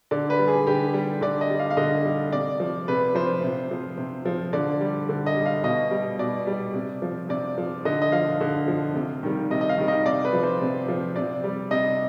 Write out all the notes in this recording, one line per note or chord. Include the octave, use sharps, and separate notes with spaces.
D3 D5
B4
G3
G#4
D3 G4
G3
D3 D5
D#5
G3
F5
F5
D3 D#5
G3
C3 D5
F3
C3 B4
F3 C5
C3
F3
C3
F3
D3 D5
G3
D3
D#5
G3
F5
B2 D#5
G3
B2 D5
G3
C3
F3
C3 D5
F3
D3 D#5
D#5
F3 F5
D3
F3
C3
D#3 G3
C3 D#5
D#5
F5
D#3 G3
D#5
C3 D5
B4
F3
C5
C3
F3
C3 D5
G3
C3 D#5